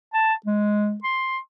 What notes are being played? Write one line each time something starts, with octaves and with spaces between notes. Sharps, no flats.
A5
G#3
C6